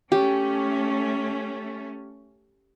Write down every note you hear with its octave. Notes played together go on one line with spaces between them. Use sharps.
A3 C#4 G4